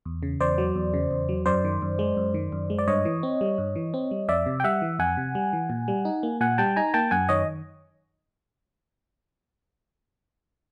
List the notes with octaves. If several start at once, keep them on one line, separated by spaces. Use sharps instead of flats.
E2
C#3
E2 C5 D5
F#3
E2
C#3
E2
F#3
F#2 C5 D5
D#3
F#2
G#3
F#2
D#3
F#2
G#3
D5
G2 C#5 D#5
E3
C4
G3
G2
E3
C4
G3
F2 D5 E5
C3
G5
G3 E5 F#5
E3
F2 F#5 G#5
C3
G3
E3
A#2
G3
D#4
A#3
A#2 F#5 G#5
G3 G5 A5
D#4 G#5 A#5
A#3 G5 A5
F#2 F#5 G#5
D#3 C#5 D#5